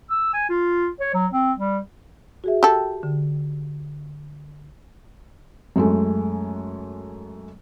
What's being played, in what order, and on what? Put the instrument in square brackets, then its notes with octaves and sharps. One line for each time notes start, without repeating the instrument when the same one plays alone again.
[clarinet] E6
G#5
F4
C#5
F#3
C4
G3
[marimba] F#4 G#4 E5
[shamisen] G4 A4
[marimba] D3
[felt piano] F#2 G#3 A3